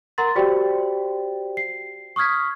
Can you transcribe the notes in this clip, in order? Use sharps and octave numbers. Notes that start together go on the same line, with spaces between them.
A#4 F#5 A#5 C6 A6
F#4 G4 C5 D5 G5
C7
C#6 D#6 F6 G#6 B6